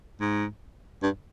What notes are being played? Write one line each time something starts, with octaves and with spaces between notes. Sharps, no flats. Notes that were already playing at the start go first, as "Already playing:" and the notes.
G#2
G2